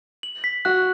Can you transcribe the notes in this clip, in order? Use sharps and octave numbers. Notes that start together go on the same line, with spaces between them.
F#7
B6
F#4 F#6